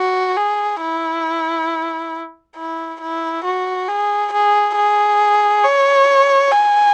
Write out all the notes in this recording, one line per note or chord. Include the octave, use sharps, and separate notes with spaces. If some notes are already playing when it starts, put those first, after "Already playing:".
Already playing: F#4
G#4
E4
E4
E4
F#4
G#4
G#4
G#4
C#5
G#5